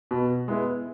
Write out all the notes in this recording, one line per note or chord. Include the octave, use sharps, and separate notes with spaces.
B2
G#3 B3 E4